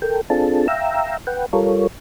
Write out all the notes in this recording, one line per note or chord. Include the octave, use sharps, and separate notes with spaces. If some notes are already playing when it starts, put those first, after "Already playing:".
A4 A#4 G5
C4 D4 F4 G#4 A4 A5
E5 F5 G5 A#5 E6
B4 F#5 G5
G3 F4 A4 A#4 C#5